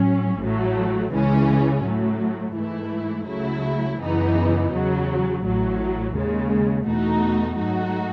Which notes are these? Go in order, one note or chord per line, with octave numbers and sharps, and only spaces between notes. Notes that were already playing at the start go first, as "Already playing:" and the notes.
Already playing: A2 F#3 C#4
A1 A2 F#3 A3
C#2 C#3 E3 G#3 C#4
A2 F#3 A3
G#2 E3 A3 E4
C#2 C#3 F#3 A3 E4
F#2 C#3 E3 B3 D#4
E2 C#3 F#3
A1 A2 F#3
D#2 C#3 G#3
E2 B2 A3 D#4 F#4
G#2 F#3 A3 D#4 F#4